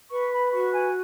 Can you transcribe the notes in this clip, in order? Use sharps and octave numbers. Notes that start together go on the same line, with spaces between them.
B4 C#6
B5
F#4 C#6
G#5